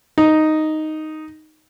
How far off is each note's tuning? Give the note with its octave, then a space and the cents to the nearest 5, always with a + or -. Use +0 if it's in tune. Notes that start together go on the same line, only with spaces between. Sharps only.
D#4 +0